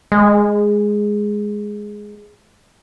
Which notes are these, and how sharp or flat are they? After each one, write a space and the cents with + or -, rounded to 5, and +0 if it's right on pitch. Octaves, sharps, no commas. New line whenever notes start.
G#3 +0